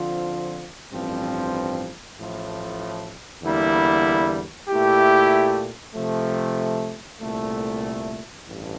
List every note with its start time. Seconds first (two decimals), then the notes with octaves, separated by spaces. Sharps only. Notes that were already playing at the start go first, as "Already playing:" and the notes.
Already playing: D3 F3 C4 F4
0.91 A1 G2 F3 C4
2.17 A1 A2 F3
3.43 E2 D3 G3 A#3 E4
4.68 A#2 A3 E4 G4
5.94 C3 F3 A3
7.20 C2 A#2 A3
8.46 A1 G2